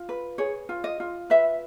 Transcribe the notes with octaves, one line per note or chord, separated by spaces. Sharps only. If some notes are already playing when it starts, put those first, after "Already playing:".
Already playing: F4
B4
G#4 C#5
F4
D#5
F4
B4 E5